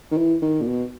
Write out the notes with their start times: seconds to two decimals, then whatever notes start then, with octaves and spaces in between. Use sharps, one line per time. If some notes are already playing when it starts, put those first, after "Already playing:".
0.11 D#3
0.17 E3
0.42 D#3
0.61 A#2
0.67 B2